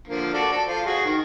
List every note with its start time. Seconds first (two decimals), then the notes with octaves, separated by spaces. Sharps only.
0.08 D3 F3 A#3
0.34 F#4 A4 D5
0.51 A4
0.68 F4 C5
0.86 F#4 G#4
1.05 D#3